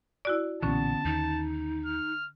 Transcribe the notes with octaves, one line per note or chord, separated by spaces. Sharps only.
E4 F#4 D5
B1 A#2 D3 E3 B3 C#4 A5
D#2 D#4
F6